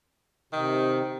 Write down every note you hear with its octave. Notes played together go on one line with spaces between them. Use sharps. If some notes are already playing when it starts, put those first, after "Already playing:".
C3 D#3